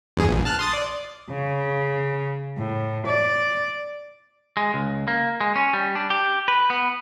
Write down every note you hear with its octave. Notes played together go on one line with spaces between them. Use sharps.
E2 G2 G#4
A#1
A5 F6 F#6
C6 D#6 A6
D5
C#3
A2
D5
G#3
C#2
A#3
G#3
C#4
G3
D4
G4
B4
B3